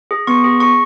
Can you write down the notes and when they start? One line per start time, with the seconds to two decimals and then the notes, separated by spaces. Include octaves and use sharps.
0.11 G#4
0.27 B3 C#6
0.44 G#4
0.60 G#4 C#6